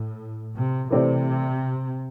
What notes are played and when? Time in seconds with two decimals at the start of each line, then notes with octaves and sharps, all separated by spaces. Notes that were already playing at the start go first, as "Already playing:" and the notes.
Already playing: A2
0.55 C3
0.91 C3 E3 A3 C4 G4 D5